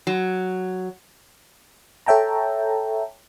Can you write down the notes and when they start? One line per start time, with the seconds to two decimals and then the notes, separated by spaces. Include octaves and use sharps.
0.07 F#3
2.06 A4 C#5 E5 G5 A5 A#5